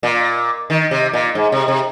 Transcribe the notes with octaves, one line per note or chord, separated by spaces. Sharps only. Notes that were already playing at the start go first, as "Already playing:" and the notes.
A#2
D#3
C3
A#2
G#2
C3
C3